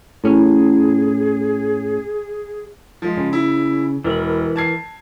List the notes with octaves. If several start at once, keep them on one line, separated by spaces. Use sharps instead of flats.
A2 C#4 G#4
F3 G#3
C#3
E4
E1 E3 A#4 B5
A5 G#6 C7